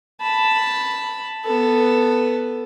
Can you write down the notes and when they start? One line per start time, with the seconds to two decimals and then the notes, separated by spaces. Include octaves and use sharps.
0.22 A5 B5
1.44 B3 A4